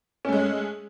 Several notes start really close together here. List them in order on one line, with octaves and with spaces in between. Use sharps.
C#4 A3 G#3